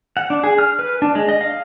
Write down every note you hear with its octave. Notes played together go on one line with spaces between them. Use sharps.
F#5
D4
G#4
F6
B4
D4
G#3
D#5
F5